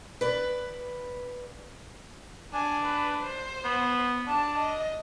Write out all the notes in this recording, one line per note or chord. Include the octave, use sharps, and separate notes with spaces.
B4 D5
D4 G#5
B4
C5
B3
D4 A5
D#5